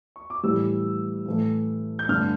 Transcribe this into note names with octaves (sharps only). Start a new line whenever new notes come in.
C#6
D6
A2 E3 G3 E6
A2 E3 A3
G6
G2 D3 A3 F6